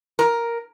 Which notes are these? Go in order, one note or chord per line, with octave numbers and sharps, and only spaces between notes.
A#4